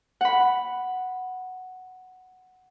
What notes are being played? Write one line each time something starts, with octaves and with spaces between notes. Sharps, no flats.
F#5 B5